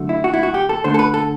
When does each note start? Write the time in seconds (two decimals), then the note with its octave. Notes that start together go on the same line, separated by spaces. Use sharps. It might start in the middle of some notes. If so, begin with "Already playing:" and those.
Already playing: D3 F#3 A3
0.09 E4
0.24 F#4
0.34 E4
0.43 F#4
0.54 G4
0.69 A4
0.84 D3 A3 C5
0.94 A4
0.99 B4
1.14 A4